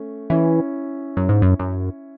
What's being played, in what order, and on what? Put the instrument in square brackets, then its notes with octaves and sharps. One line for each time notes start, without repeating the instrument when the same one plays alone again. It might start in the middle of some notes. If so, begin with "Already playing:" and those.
Already playing: [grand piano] A3 C#4
[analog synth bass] E3 [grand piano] C#4 E4
[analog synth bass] F#2
G#2
F#2
F#2